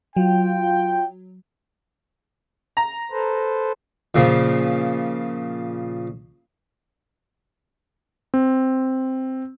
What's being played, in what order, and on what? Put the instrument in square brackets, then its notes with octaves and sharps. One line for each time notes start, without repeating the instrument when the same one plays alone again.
[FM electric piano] F#3 [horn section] F4 G5
[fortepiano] A#5
[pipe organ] A4 B4 C5
[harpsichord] A#2 C#3 F3
[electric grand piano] C4